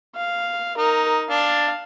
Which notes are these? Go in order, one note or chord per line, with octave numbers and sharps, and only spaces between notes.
F5
D#4 A#4
D4 F5 A5